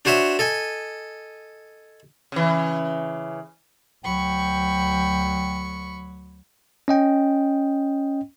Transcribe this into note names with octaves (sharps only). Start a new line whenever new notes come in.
D4 F#4 C5 C#5 E5
A4 D#5 G#5
C#3 E3
D2 F#3 G5 B5 C#6
C#4 D#5 G5